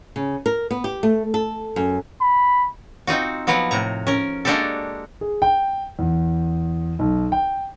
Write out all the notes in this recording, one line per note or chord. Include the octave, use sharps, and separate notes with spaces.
C#3
A#4
B3
G4
A3
A4
F#2
B5
C4 D#4 F4 F#4
F3 F#3 A#3 B3 F#4
A2 C3 A#5
C#4 A#4
G#3 A#3 D4 F#4 G4 A4
G#4
G5
E2
B1
G5